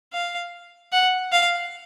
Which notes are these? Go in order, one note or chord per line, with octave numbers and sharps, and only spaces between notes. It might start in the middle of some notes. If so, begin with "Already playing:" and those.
F5
F#5
F5